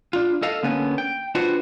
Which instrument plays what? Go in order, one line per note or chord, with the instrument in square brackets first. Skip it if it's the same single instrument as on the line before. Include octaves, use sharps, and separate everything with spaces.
[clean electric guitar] D4 F4
A4 D#5 F5
D3 A#3 B3 C#4
G5
D4 F4 F#4 B4 C5